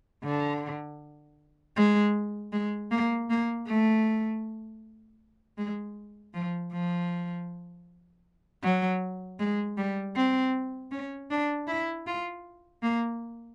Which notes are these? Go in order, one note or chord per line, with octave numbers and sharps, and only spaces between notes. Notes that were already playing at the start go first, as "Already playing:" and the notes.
D3
G#3
G#3
A#3
A#3
A3
G#3
F3
F3
F#3
G#3
G3
C4
C#4
D4
E4
F4
A#3